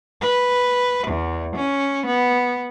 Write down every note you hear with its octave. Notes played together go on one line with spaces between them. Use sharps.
B4
E2
C#4
B3